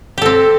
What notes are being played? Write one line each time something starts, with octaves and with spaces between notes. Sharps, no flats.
C4 G4 A4